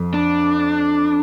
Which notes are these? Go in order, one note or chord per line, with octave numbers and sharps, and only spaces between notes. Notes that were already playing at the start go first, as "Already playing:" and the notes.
Already playing: F2
D4